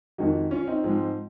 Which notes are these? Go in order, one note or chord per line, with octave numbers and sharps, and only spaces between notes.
F2 D#3 G#3 D#4 F#4
C#4 F4
C4 D#4
G#2 F3 G#3 C4